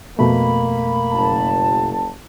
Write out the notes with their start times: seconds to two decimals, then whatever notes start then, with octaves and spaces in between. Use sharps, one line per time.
0.19 F2 B2 A3 A#3 B5
1.12 F#1 A5